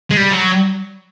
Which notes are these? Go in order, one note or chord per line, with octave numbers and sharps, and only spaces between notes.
G#3
G3
F#3